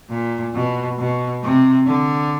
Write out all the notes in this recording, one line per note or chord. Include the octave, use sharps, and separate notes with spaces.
A#2
B2
B2
C3
D3